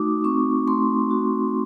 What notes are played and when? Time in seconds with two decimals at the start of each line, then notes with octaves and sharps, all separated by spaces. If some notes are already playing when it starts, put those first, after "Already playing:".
Already playing: A3 D#4 F#4 D6 D#6
0.24 C4 C#6
0.68 A3 C6
1.11 F#4